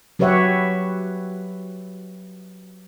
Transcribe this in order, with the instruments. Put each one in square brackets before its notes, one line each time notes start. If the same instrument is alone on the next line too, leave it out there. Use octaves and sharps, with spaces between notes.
[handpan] F#3 G4 B4 C#5 E5 F#5